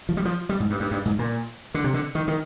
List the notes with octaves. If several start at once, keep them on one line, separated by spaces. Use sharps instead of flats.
F3
G3
F3
G3
G#2
G2
G2
G2
G#2
A#2
D3
C3
D3
D#3
D#3